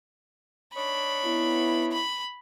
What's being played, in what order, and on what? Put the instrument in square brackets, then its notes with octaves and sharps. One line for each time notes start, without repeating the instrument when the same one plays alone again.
[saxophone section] D4 D#4 C#5 [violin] B5
[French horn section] B3 E4
[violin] B5